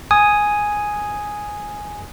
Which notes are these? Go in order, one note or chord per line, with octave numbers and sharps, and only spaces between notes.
G#5 D#6